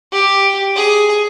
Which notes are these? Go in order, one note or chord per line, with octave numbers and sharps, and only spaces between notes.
G4
G#4